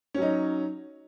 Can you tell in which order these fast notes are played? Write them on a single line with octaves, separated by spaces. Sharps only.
C#4 F#3 D#4